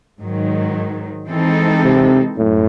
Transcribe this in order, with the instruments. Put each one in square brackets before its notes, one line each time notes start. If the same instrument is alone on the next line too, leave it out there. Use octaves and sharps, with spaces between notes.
[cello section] G#2 D#3 F#3
E3 G#3 C4 D#4 A4
[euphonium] C3
[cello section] F#2 [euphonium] A2